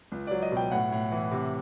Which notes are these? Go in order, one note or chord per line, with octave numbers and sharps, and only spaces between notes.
C#2
F#3 D5
D#5
B2 G5
A2 F#5
A2
E3
C3